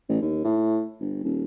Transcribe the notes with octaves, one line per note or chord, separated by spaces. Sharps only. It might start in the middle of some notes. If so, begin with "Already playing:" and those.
A1
D#2
A2
G1
D#1